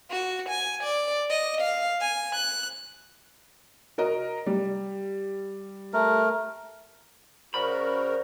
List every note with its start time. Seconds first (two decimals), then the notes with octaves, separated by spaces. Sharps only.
0.11 F#4
0.49 G#5
0.83 D5
1.30 D#5
1.61 F5
2.01 G#5
2.35 F#6
3.98 F#4 A#4 D#5
4.46 G3
5.94 A3 A#4
7.54 C#3 F#4 A#4 C5 D5 B5